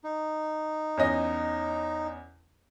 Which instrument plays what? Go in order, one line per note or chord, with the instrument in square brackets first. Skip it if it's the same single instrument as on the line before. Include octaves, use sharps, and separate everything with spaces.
[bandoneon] D#4
[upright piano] E2 C#4 D#5